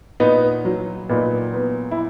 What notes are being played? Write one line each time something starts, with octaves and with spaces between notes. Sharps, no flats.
A#2 B3 D#4
F#3
A#2 B3 D#4
B3
E4